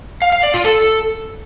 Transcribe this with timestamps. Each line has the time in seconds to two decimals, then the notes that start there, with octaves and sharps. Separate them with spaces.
0.22 F5
0.32 F5
0.43 D5
0.54 F4
0.65 A4